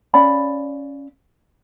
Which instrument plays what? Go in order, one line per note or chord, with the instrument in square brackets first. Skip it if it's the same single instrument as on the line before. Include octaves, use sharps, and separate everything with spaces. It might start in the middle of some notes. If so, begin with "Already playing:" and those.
[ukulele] C#4 D5 F5 B5